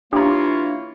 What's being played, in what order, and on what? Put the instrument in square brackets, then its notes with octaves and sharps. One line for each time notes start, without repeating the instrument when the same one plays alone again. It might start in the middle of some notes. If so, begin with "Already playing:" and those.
[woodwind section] E3 A#3 E4 [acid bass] D4 [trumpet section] F4 C#5 [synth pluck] G4 A#5